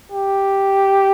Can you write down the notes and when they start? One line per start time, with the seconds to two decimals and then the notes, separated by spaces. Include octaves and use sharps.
0.12 G4